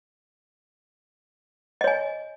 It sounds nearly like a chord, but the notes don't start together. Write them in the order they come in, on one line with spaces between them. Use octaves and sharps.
D#5 C#5 G#5